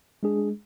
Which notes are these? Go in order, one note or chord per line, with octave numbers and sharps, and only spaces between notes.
G#3 D4 G#4